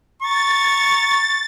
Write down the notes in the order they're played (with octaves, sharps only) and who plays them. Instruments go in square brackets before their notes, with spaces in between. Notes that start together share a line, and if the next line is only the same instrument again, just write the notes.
[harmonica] A#5 C#6 [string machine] A6